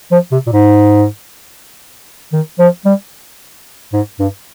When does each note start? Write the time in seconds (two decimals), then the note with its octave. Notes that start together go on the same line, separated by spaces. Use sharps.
0.12 F3
0.32 C3
0.47 A#2
0.52 G#2
2.33 D#3
2.59 F3
2.85 G3
3.93 G#2
4.19 G2